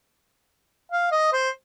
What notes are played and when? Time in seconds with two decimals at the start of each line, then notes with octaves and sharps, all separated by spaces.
0.91 F5
1.11 D#5
1.32 C5